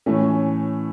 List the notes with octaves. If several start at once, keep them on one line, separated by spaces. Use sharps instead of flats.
A2 E3 A3 C#4